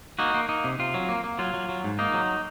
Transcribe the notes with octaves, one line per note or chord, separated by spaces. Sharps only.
A#3 D#4 F#4
A#3
A#3 D#4
C3
C3 F4
F#3
A#3
A#3
F#3 F4
F#3
F#3
G#2
A#3 D#4
F#3